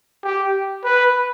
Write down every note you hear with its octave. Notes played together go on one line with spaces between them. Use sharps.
G4
B4